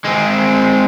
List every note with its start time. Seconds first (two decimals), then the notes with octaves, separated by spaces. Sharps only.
0.05 G#3 C4